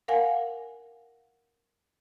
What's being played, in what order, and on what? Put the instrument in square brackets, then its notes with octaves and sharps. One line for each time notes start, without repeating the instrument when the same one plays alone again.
[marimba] A#4 F5 F#5 G#5